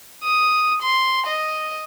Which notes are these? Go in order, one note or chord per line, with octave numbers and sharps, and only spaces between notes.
D#6
C6
D#5